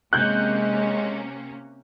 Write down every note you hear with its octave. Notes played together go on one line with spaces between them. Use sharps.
C3 G#3 A#3 C#4 F#6 G6